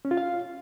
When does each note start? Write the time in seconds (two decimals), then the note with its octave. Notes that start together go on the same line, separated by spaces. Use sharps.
0.05 C#4
0.11 F4
0.17 F5